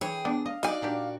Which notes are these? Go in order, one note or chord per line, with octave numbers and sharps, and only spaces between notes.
E3 G#4 C#5 G5
B3 D4
D#5 F5
D#4 F#4 D5 G#5
A#2 D4 G4